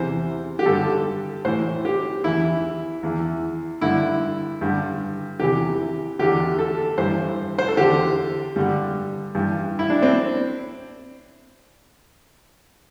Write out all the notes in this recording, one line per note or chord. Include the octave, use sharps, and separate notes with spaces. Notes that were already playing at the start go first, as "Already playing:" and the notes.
Already playing: E2 C3 E3 C5
G4
G2 D3 A4
A2 E3 C5
G4
E2 E3 E4
E2 E3
G2 D3 E4
G2 D3
E2 C3 E3 G4
E2 D3 G4
A4
G2 E3 C5
C5
A4
E2 D3 G4
G2 D3 G3
G2 E3
E4
D4
C4